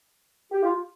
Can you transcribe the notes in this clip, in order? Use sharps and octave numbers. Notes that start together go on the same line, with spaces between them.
G4
F4